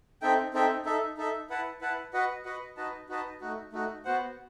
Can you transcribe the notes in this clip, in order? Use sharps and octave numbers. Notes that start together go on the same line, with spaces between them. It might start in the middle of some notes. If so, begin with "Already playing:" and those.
C4 D#4 A4 E5 G5
C4 D#4 A4 E5 G5
D#4 A4 E5
D#4 A4 E5
E4 B4 F#5 A5
E4 B4 F#5 A5
F#4 B4 D#5 F#5
F#4 B4 D#5 F#5
D#4 F#4 B4 D#5 A5
D#4 F#4 B4 D#5 A5
A3 D#4 F#4
A3 D#4 F#4
B3 F#4 C5 F#5